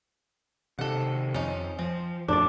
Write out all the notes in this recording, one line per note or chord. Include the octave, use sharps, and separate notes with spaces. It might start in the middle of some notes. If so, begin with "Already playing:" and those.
C3 D#3 A4 F#5
F2 C#4 D#4
F3 C4
F2 A2 D4 D5